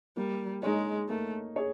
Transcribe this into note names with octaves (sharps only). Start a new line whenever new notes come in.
G3 A#3
G#3 D#4 G#4 C#5
A3 A#3
G#4 C#5